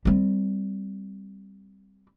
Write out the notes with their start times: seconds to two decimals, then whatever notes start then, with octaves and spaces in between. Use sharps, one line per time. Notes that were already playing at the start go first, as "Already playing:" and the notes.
0.05 G3 C4